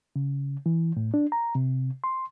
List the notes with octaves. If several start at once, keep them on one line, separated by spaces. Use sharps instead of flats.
C#3
E3
A2
D4
A#5
C3
C6